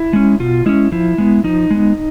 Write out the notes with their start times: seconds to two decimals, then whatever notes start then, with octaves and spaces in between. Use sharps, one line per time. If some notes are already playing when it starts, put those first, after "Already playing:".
Already playing: E4
0.13 G#3 C#4
0.40 B2 F4
0.66 G#3 C#4 E4
0.92 F3 E4
1.18 G#3 B3
1.44 F3 D#4
1.71 G#3 B3